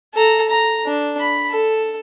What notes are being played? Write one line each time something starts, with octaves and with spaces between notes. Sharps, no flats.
A4 A#5
A#5
D4
B5
A4